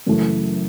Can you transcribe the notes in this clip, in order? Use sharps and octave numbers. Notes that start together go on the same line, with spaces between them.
F#2 C#3 E3 A3